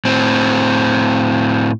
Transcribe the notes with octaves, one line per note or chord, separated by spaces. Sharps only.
A2 C4